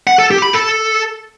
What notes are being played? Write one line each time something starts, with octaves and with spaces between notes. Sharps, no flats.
F#5
A4
G4
B5
A4